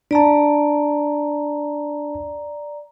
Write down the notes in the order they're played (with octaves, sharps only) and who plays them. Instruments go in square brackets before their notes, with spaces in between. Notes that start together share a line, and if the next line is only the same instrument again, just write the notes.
[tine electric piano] D4 A5 [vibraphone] D5 A#5